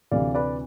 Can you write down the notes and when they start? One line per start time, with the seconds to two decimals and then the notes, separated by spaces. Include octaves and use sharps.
0.11 D2 C3 E3 D5 F5
0.35 B4 D5